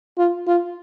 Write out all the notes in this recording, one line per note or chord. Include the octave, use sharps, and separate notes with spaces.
F4
F4